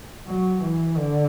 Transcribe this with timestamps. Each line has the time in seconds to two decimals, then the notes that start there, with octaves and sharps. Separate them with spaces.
0.27 F#3
0.63 E3
0.97 D3